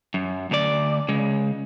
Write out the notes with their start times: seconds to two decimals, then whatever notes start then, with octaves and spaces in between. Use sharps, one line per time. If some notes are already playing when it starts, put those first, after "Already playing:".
0.14 F#2
0.51 D2 D5
1.08 C#3 G#3